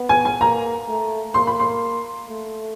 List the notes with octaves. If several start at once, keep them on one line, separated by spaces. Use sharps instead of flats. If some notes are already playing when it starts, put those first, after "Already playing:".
Already playing: B3
G#5
G#5
A#3 A#5
A3
A#3 C6
B5
C6
A3